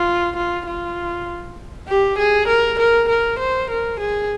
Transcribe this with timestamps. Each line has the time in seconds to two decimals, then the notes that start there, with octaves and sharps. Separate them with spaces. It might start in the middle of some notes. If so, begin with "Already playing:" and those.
Already playing: F4
0.36 F4
0.67 F4
1.88 G4
2.19 G#4
2.48 A#4
2.79 A#4
3.09 A#4
3.39 C5
3.71 A#4
4.00 G#4